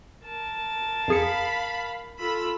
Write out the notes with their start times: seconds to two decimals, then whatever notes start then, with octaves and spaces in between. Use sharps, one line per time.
0.25 A#4 A5
1.08 F2 G#4 F5 B5 C#7
2.20 F4 A4 B5 E6